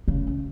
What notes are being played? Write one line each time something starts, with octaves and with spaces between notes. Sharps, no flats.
C#3